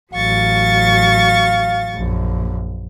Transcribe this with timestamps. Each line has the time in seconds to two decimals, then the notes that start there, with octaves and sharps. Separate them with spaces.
0.13 A1 F#3 F5 C#6 A6
1.95 A#1 F#2